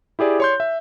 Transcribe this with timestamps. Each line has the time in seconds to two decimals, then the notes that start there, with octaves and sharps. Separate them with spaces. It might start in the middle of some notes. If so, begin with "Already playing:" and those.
0.19 E4 G4 G#4 D5
0.40 C#5 C6 G6
0.60 E5